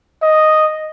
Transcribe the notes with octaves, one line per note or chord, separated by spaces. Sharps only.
D#5